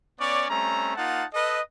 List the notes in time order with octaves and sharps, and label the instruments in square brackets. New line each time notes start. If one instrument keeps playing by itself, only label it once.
[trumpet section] B3 C#4 C#5 D5
G3 A3 C4 C#4 A#5
A#3 D#4 F4 F#5 A5
A4 B4 D#5